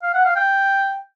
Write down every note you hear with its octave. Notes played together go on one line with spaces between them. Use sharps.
F5
F#5
F5
G5